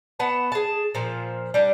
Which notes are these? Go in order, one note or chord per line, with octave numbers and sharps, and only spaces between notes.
B3 F#5 A5
G#4 A5
A#2 F3
G3 D4